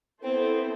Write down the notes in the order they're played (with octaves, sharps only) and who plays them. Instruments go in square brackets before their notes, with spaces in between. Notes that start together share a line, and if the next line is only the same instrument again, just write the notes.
[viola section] B3 E4 A4 C5 [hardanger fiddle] C4